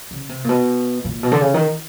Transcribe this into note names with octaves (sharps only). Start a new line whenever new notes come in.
C#3
C3
A#2
B2
A#2
B2
D3
C#3
D#3